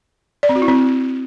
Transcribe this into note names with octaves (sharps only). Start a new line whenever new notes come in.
D5
C4
F#4
E4
C4